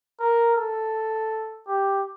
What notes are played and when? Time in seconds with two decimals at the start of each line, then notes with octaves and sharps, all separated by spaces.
0.20 A#4
0.56 A4
1.67 G4